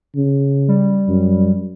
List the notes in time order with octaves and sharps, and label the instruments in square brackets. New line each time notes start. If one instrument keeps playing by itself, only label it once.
[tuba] C#3
[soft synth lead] G3
[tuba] F#2